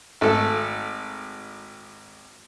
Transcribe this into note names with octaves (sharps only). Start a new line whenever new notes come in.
G#1 A3 A4